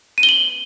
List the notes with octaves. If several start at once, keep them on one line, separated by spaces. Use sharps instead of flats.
D#7
G7
F#7